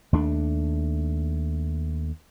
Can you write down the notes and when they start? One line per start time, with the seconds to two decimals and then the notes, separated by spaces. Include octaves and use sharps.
0.13 D#2 A3 D4